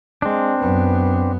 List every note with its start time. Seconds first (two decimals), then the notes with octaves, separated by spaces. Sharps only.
0.22 G#3 C4 D4
0.60 F#2 B3